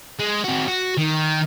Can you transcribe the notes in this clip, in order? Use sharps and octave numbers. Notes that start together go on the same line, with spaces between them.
G#3
C4 F#4
F#4
D#3